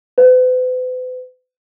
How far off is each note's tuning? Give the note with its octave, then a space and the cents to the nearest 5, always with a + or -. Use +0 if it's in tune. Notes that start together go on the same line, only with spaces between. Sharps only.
B4 +45